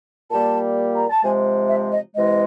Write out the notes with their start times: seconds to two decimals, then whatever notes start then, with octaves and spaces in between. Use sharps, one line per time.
0.31 A#2 G3 A#3 A5
0.95 A#5
1.10 A5
1.23 C3 F3 G#3 G#5
1.68 E5
1.92 D#5
2.15 C3 E3 G#3 D#5